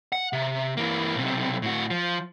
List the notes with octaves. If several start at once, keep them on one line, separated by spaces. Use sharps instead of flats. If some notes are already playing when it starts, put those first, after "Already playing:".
F#5
C3
E3 A#3
B1 C3
A2 F#4
F3